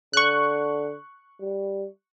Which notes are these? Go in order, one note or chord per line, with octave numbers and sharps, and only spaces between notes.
D3 C#6 F#6
G3